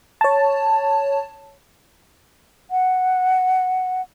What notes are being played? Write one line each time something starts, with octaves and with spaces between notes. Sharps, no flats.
C#5 A5
F#5